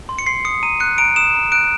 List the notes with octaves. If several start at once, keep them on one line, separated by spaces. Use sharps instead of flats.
C6
C#7
C6 C7
D#6 C#7
A#5 D#7
F#6 C#7
A#5 D7
D#6 E7
A#5
F#6 D7